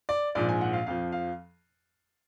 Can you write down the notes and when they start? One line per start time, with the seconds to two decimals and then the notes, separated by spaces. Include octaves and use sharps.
0.09 D5
0.35 A#1 G#2 F3 D5
0.49 G#5
0.61 F#5
0.73 F5
0.86 F2 F3 F5
1.12 F5